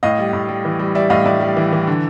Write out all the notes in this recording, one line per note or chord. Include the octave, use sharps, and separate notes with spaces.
A2 D#5 F5
G3
A2
G3
E3
G3
G3 D5 E5
A2 D#5 F5
A2 D5 E5
G3
E3
E3
D3